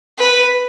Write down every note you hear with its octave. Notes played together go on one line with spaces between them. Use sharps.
B4